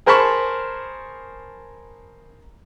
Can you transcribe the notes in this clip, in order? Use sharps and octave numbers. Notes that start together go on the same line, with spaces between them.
G#4 A#4 C5 A5 B5 C#6